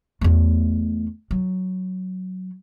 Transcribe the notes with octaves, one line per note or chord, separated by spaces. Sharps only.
E2 A3
F#3